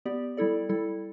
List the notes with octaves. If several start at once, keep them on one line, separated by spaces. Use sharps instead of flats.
B3 G4 D5
G3 E4 A4 D5
G3 E4 A4